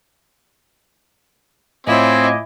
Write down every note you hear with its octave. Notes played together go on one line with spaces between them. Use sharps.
A2 C4 E4 F4 C#5 D#5 G#5 D6